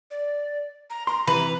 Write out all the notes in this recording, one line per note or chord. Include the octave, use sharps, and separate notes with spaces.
D5
A#5
A#5 C6
C3 E3 B4